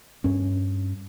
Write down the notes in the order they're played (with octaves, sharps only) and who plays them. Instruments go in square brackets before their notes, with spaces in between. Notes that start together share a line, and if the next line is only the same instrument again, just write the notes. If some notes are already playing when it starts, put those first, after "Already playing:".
[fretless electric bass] G2 C#4